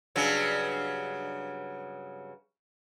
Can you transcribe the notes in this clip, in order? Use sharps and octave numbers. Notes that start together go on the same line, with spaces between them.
G2 C#3 F#3